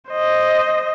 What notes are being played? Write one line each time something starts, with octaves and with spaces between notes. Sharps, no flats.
C5 D#5